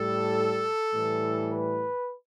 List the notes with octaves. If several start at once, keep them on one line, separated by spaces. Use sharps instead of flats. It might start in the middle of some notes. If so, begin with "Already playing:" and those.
Already playing: A2 G3 A4
A2 E3 G3
B4